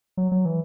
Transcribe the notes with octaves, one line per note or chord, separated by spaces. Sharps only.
F#3
F#3
E3